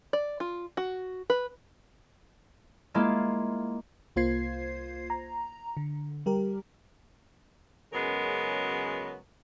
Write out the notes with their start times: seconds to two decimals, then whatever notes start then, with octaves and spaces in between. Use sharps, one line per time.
0.13 D5
0.40 F4
0.77 F#4
1.30 B4
2.94 G#3 A#3 E4 F4
4.16 C2 A#3 F4 C5 G#6 C7
5.10 A#5
5.77 D3
6.26 G3 G4 A#4
7.92 F#2 C#3 F#3 G#3 B3 A#4